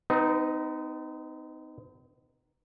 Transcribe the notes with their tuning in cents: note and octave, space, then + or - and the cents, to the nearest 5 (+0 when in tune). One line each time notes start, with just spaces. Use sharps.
C4 -45 D#4 +0 B4 +0